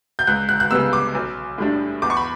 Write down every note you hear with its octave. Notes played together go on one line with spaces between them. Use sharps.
G6
C#2 F#6
F#6
F#6
C#3 G3 B3 E6
D6
B1
A2 G3 D4
E2 D6
C#6
B5